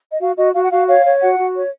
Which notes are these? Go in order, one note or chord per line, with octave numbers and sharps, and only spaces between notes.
D#5
F#4 F5
F#4 D#5
F#4 F5
F#5
F#4 F5
C#5 F5
C#5
F#4 F#5
F#4
C#5